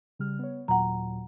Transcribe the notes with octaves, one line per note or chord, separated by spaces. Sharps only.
C#3 G3 F6
B3 C#5
D#2 A#2 F#3 F#5 A#5